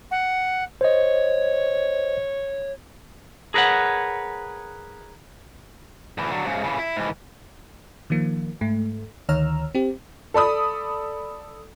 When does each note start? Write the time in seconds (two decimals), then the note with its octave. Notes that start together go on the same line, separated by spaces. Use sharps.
0.11 F#5
0.81 C5 C#5 D#5
3.54 G#4 A#4 B4 C#5 F#5
6.18 D2 E3
6.31 D3 F#3
6.45 G#2 C#3
6.64 C#3 E3
6.79 E4
6.96 G#2 E3
8.10 D#3 F3 A#3
8.61 G#2 A3
9.29 D2 D#3 C#5 A#5 E6 F6
9.75 C4 G4
10.34 A4 D5 B5 D#6